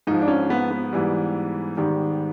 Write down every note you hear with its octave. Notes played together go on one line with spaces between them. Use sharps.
G#2 F3 D#4
D4
C#4
B3
B3
G#2 E3 G3
G#2 D#3 G3